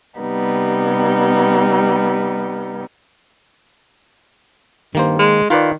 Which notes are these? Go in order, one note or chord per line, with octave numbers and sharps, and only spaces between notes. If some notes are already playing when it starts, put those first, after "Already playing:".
C3 G3 B3 D#4
G2 D#3 A#3 C5
G#3
D#3 F4 B4 D5